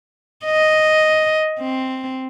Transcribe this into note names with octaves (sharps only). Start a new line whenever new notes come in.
D#5
C4